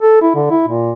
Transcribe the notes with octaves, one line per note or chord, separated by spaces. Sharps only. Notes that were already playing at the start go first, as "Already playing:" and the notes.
A4
E4
D3
E4
A#2